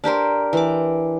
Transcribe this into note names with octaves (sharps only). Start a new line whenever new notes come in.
D4 G4 A#4 C5
E3 D6